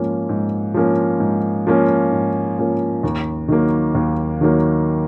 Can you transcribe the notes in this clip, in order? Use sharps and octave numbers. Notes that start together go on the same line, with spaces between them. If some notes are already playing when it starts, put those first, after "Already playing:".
Already playing: G#2 F3 A#3 C#4
G#2
F3 A#3 C#4
G#2
F3 A#3 C#4
G#2
F3 A#3 C#4
D#2
D#3 F#3 A#3
D#2
D#3 F#3 A#3